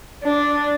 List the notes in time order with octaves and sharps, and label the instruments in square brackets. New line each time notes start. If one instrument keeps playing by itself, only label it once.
[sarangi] D4